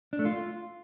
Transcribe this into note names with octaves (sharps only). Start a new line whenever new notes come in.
D4
A3
F4